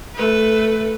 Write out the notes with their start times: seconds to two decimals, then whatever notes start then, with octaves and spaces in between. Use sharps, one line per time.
0.15 A3 B4